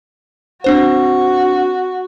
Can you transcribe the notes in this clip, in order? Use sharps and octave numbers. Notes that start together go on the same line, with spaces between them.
C4 D4 F#4 C5